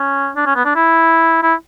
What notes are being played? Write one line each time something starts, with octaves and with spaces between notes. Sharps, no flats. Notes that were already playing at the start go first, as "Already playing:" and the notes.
Already playing: C#4
D4
C#4
B3
D4
E4
E4